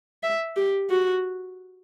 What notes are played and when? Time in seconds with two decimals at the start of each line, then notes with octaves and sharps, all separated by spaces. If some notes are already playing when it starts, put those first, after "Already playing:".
0.23 E5
0.56 G4
0.90 F#4